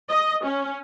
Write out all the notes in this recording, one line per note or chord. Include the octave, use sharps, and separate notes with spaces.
D#5
C#4